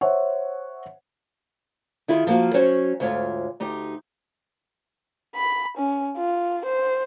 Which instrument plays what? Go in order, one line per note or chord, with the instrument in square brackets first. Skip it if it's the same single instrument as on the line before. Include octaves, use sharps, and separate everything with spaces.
[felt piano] C5 C#5 E5 F#5
[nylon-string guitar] D#3 E4 F4 G#4
F3 A#3 F#4
F#3 C#4 F#4 C5 C#5
D2 G#2 F4 C#5
D2 D#4 G4
[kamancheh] B5
C#4
F4
C5